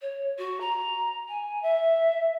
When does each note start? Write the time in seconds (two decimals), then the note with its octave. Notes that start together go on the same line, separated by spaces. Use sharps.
0.01 C#5
0.38 F#4
0.60 A#5
1.28 G#5
1.62 E5